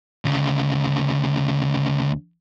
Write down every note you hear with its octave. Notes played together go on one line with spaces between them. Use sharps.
D2 C#3